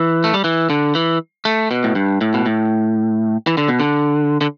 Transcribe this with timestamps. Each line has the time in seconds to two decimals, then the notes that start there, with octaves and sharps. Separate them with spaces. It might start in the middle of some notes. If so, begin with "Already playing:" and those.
Already playing: E3
0.24 A3
0.34 G3
0.44 E3
0.70 D3
0.95 E3
1.45 A3
1.71 B2
1.84 A2
1.95 G2
2.21 A2
2.34 B2
2.46 A2
3.47 E3
3.57 D3
3.68 B2
3.80 D3
4.41 D3